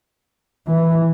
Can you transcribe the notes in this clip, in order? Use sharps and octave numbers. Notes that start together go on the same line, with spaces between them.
E3